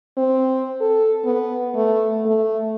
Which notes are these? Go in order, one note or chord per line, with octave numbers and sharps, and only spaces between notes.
C4
A4
B3
A3
A3